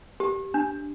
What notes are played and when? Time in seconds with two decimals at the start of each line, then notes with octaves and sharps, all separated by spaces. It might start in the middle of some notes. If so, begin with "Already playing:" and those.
0.20 G4
0.54 D4